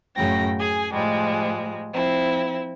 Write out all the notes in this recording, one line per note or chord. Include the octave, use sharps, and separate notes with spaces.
F#2 A2 C#3 G5 A#6
G#4 G#5
A2 F3 G3 G#3
F3 C4 E4